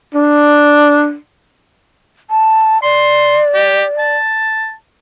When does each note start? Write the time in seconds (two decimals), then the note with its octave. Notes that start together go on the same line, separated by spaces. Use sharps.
0.14 D4
2.30 A5
2.83 D5 C6
3.54 G4
3.99 A5